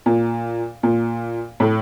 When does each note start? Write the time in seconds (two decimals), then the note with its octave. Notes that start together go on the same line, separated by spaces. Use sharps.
0.06 A#2
0.83 A#2
1.60 A2